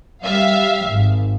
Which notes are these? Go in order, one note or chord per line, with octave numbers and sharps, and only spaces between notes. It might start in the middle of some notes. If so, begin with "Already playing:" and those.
G3 E5 F5
G#1